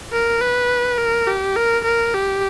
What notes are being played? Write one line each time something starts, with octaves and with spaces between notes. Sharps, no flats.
A#4
B4
A#4
G4
A#4
A#4
G4